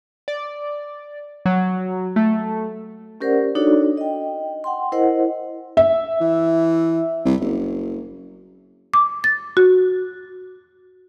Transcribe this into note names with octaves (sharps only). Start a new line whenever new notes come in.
D5
F#3
A3
C#4 G4 A#4 C5 D5 F#5
D4 D#4 F#4 A4 C#5 D5
D#5 G5
F#5 G5 C6
E4 A#4 C5 D#5 F#5
E5
E3
C2
F#1
D6
A6
F#4